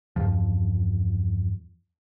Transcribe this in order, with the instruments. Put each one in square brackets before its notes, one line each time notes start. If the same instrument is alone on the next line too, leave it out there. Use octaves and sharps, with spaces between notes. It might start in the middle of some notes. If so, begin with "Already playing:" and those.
[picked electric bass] E2 G2 F3